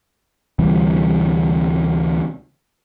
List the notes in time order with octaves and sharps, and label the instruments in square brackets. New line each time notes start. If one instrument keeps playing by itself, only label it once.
[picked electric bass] D2 C3 E3 G3